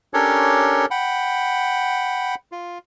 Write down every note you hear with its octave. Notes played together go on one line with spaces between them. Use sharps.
C#4 D4 G4 A4 A#4 C#5
F#5 G5 B5
F4